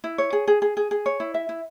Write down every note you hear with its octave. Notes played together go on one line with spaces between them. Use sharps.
E4
C#5
G#4
G#4
G#4
G#4
G#4
C#5
E4
E5
E4